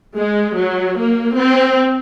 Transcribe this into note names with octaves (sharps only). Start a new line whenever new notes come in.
G#3
F#3
A#3
C4